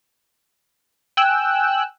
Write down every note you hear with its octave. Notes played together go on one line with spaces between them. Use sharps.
G5 G#5 E6 F#6